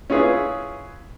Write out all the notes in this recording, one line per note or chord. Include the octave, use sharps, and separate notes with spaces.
C#4 E4 F4 G#4 B4